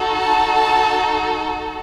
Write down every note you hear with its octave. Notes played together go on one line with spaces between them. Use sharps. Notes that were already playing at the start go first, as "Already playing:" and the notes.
Already playing: D#4 F#4 A4
A5
A5